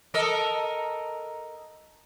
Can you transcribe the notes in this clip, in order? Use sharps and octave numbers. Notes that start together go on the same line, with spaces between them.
A4 A#4 D#5